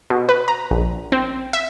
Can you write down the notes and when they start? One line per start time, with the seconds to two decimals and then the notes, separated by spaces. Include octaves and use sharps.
0.10 B2
0.29 B4
0.48 A#5
0.71 A#1
1.12 C4
1.53 E5